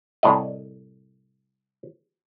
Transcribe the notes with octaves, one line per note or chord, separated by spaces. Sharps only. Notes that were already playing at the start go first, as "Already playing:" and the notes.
C2 A2 D5 D#5